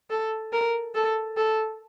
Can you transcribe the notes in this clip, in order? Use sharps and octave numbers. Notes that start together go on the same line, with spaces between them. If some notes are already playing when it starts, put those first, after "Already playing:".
A4
A#4
A4
A4